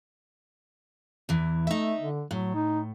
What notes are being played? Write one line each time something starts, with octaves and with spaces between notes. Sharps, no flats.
E2 E3
A3 D#4 E5
D3
A2 F#3
D#4